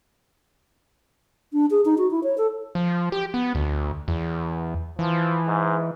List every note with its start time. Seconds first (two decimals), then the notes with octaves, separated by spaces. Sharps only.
1.53 D4
1.71 G#4
1.85 D#4
1.98 F#4
2.11 E4
2.23 C#5
2.38 A4
2.75 F3
3.12 G4
3.34 B3
3.55 D2
4.08 E2
4.99 E3 F3
5.47 G#2